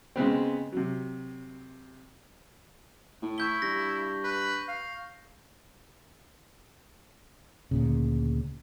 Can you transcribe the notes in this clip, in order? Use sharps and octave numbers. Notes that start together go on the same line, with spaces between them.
C#3 G#3 B3 C4
C3 F#3
A2
E4 C#6 G6 G7
G2 A#6
B4
F5
D2 A#2 C#3